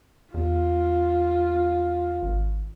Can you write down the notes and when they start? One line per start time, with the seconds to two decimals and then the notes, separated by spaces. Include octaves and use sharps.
0.34 E2 F4
2.22 G#1